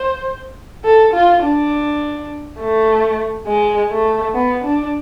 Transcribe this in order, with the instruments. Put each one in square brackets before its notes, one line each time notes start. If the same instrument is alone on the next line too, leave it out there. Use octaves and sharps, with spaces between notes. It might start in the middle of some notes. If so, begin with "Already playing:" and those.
Already playing: [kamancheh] C5
A4
F4
D4
A3
G#3
A3
B3
D4